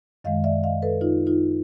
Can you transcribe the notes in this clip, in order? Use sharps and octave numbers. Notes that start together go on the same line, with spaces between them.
F#2 D#3 G#3 D#5 F5
D5 E5
D#5 F5
A4 B4
D#4 F4
D#4 F4